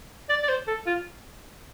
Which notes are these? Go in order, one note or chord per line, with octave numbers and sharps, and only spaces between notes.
D5
D5
C5
A4
F4